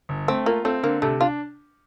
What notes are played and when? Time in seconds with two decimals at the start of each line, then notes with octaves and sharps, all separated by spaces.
0.09 G1
0.28 A3 C4
0.46 A#3 F4
0.65 A3 C4
0.83 D3 A#3
1.02 C3 A3
1.21 D4 F4